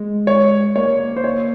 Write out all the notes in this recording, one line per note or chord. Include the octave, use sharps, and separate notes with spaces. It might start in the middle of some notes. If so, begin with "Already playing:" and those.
Already playing: G#3
C#5
A#3 C#5
C5
C#5